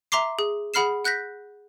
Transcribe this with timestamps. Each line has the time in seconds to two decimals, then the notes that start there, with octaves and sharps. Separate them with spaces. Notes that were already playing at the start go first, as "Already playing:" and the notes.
0.12 E5 A#5 C6 D6 C7
0.39 G#4
0.74 G#4 F#5 B5 F6 C7 E7
1.05 F#5 F#6 G6 A#6 B6